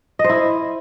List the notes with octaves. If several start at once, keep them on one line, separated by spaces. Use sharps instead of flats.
D#5
C5
E4